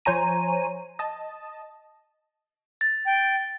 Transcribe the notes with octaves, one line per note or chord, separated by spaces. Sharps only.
F3 C5 C#5 G#5 A#5 D#7
D#5 A5
A6
G5